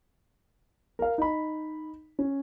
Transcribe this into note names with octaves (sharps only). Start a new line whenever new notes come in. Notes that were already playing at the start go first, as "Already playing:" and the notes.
A#4 F5
D#4 B5
C#4